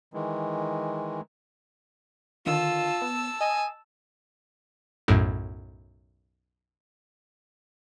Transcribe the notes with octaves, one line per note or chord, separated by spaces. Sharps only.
D#3 E3 G#3
D3 D#3 F4 A5 E6
B3
D#5 G#5
B1 F#2 A2